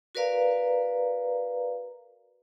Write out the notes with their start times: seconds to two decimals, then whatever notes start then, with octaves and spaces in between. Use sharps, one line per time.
0.15 F#4 A#4 B4 D5 F5 A#5